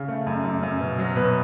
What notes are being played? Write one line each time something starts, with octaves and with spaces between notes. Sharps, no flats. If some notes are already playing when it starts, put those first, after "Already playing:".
Already playing: C#3
A3
F#2
F#2
F#2
B2
F#3
B2 B4